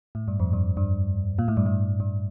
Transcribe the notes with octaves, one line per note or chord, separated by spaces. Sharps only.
A2
G2
F2
G2
G2
A#2
A2
G2
A2
G2